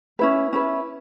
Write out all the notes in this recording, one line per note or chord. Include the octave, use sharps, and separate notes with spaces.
C#4 E4 B4
C#4 E4 B4